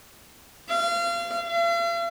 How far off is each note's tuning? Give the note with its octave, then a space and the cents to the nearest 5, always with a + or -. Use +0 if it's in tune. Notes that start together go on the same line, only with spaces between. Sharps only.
F5 -30
F5 -45